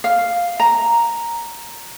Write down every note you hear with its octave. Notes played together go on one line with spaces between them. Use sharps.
F5
A#5